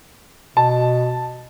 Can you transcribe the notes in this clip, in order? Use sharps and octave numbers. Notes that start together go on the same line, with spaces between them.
B2 A5